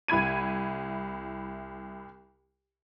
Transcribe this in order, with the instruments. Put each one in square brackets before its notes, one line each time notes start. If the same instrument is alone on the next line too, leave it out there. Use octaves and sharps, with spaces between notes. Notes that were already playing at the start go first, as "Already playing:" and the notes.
[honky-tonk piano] C2 E4 B5 G#6 D#7